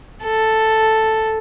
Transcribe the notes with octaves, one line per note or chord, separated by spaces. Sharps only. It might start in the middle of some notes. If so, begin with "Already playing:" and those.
A4